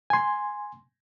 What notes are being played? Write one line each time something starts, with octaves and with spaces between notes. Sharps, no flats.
G#5 C6